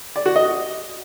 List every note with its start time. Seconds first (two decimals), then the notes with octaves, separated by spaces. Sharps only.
0.16 D5
0.26 F#4
0.36 D#5